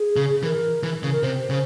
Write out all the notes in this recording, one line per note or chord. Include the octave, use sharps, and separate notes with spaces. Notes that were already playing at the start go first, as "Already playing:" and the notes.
Already playing: G#4
C#3
E3 A#4
E3
C#3
A#4
C3 C5
C#3